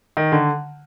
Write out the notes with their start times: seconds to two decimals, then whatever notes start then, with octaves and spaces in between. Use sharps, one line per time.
0.17 D#3
0.32 D3